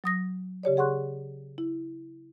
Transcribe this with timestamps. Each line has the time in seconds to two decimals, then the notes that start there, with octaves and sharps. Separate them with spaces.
0.04 F#3 D#6 A#6
0.63 C#3 G4 C#5 D5
0.77 G#4 F#5 C6 C#6 F#6
1.58 E4